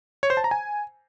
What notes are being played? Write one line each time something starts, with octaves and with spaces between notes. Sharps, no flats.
C#5
C5
A5
A#5
G#5